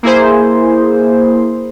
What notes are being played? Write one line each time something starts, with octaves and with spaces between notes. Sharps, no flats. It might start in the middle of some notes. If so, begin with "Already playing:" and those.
A#3 E4 G#4 C5